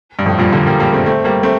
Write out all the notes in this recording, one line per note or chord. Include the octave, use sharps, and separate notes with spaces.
G2
F2 A2
G2 A#2
A#2 D3
G3 A#3
G3 A#3
A3 C4
A3 C4
G3 A#3
A3 C4